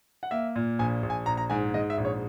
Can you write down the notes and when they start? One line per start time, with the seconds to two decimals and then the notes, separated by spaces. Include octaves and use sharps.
0.23 F#5
0.31 A#3 E5
0.56 A#2
0.79 A#1 G#5
1.03 A#1
1.10 G#5
1.26 A#1 A#5
1.37 A#5
1.50 G#2 G#5
1.74 G#2 D#5
1.90 E5
1.98 A#1
2.05 C#5